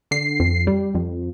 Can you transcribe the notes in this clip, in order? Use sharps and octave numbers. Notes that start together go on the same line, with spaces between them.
D3 C7
F2
G3
F2